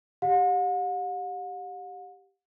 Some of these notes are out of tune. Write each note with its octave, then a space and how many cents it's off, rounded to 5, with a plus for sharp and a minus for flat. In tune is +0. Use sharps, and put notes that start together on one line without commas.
G4 +0 F#5 -45